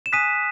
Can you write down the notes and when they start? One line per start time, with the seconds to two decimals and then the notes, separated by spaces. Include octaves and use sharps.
0.06 E7
0.12 G#5 D#6 F#6 B6 D#7